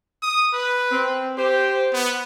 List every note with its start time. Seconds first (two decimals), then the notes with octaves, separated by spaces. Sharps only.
0.22 D#6
0.53 B4
0.91 C4
1.38 G4 C5
1.93 B3